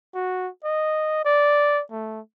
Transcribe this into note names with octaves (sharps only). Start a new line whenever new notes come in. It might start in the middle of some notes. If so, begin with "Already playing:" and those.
F#4
D#5
D5
A3